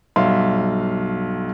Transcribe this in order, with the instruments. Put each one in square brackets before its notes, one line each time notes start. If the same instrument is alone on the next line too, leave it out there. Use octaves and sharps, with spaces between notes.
[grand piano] B1 G2 E5 F5 C6